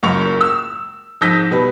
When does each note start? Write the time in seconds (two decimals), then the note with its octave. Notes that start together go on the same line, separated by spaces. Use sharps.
0.03 F#1 C#2 F#2 A#4 C#6 F7
0.41 E6
1.21 F2 G#2 E6 G6 A#6 B6
1.51 B2 G3 B4